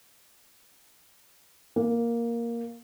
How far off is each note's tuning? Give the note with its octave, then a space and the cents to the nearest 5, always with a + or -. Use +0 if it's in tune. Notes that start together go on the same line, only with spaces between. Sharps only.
A#3 +5